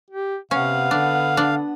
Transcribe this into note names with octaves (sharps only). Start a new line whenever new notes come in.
G4
C3 B3 C#4 F5 F#5
D3 D4
D4